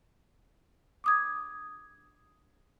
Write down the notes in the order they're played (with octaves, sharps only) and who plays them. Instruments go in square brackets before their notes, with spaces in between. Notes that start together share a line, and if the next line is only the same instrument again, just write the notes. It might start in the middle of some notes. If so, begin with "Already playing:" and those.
[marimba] D6 D#6 G#6